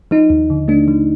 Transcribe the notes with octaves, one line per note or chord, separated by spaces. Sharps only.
F3 D#4
D#2
D3
A3 D4
F3